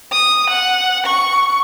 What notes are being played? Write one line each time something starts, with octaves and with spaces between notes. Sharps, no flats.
D#6
F#5
C#6